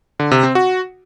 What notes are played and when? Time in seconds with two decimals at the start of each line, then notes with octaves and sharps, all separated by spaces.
0.20 D3
0.31 C3
0.43 C4
0.55 F#4